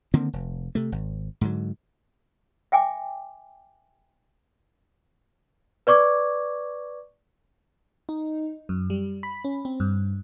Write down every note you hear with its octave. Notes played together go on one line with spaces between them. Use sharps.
D3 D#3 A#3 C4
F1
C3 A3
G#1
G#2 D3 F#3
E5 G5 G#5 D6
B4 D5 C#6 D6 G#6
D#4
F#2
G3
B5
C#4
C4
G2